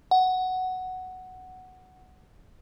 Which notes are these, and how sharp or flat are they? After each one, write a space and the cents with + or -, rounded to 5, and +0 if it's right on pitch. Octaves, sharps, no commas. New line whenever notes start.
F#5 +5